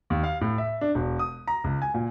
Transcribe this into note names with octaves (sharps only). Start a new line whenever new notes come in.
D#2
F5
A2
E5
D4
E1
D#6
A#5
C#2
G#5
A#2